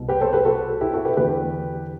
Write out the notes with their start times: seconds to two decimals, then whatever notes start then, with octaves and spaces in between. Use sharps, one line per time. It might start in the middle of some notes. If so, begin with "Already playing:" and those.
Already playing: C2 B2
0.08 G4 B4
0.21 A4 C5
0.33 G4 B4
0.45 F#4 A4
0.81 E4 G4
0.94 F#4 A4
1.05 G4 B4
1.17 E2 D3 G4 B4